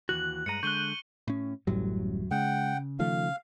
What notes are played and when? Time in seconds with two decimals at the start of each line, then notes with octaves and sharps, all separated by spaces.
0.09 D#2 E3 F#4 F#6 F#7
0.46 G2 G#3 A#5 C#7 D#7
0.63 D3 G#3 C#6 F#6 G6 D#7 G7
1.28 A2 C#4
1.67 D1 A1 F#2 A2 F#3 G3
2.31 C#3 G#3 F#5 G5
2.99 D#3 F3 A3 F5